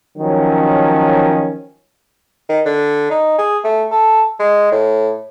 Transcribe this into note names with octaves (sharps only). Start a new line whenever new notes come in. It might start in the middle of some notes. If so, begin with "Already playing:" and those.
D#3 F3 F#3 C#4
D#3
D3
D#4
G#4
A3
A4
G#3
A2